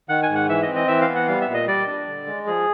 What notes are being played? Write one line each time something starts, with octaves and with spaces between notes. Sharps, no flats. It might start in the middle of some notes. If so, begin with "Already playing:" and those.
D#3 F#5
G#5
G#2
F#5
E3 E5
D#5
C4
D#5
E3 E5
F5
B3
F#5
G3 F5
E5
A#2
D#5
G3 D5
D4
D3
G#3
F3 G#4